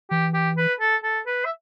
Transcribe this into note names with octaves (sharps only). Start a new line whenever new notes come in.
E3 G4
G4
B4
A4
A4
B4
E5